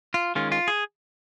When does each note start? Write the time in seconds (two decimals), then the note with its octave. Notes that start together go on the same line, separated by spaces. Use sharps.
0.14 F4
0.35 D#3 G#3 C#4 F4
0.52 F4
0.68 G#4